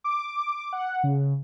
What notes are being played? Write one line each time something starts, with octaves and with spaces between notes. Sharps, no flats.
D6
F#5
C#3